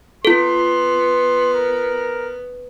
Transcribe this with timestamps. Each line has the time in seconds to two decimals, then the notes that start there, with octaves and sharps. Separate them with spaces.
0.25 B3 F4 A4 C6
1.54 A#4